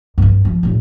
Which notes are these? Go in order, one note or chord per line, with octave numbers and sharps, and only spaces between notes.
G2 C4
F3
E1 A2